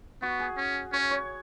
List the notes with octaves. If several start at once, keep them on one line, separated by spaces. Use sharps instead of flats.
B3 F#4
G#4
C#4
C#4 C#5
C#5